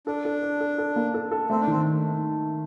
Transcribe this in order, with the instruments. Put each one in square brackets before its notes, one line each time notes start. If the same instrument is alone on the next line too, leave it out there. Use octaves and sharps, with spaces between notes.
[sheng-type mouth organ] D4 [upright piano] A4
[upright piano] A4
A4
A4
A4
A#3
A4
A4
[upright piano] A3 [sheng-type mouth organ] C4
[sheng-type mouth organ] D4
[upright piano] D#3 [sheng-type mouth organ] C4